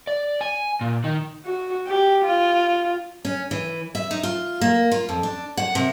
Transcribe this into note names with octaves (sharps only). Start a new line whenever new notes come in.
D5
G#5
A#2
D#3
F#4
G4
F4
C#4
E3
E5
D#4
F4
A#3
F4
F2
D4
F#5
C3